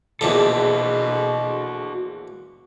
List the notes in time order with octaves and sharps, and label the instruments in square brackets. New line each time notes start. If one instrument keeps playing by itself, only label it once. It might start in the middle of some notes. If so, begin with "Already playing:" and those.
[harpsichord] A#1 E2 D3 [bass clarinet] B2 [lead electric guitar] F#4 A4